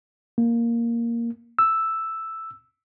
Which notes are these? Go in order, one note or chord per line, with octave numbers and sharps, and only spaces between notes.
A#3
E6